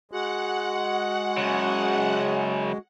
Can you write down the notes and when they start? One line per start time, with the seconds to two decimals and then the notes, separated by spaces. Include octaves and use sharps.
0.12 G#3 F#4 F#5
1.37 F#2 C#3